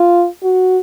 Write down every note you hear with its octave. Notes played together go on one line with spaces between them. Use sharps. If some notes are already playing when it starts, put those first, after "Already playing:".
Already playing: F4
F#4